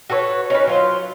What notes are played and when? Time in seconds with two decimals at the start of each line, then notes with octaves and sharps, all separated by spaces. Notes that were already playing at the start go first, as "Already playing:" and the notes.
0.09 F#4 A4 B4 C#5
0.50 C#4 D#4 A#4 B4
0.67 F#3 F4 C5